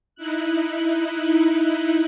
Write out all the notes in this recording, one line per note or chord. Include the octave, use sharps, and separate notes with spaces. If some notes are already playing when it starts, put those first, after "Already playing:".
D#4 E4 F#6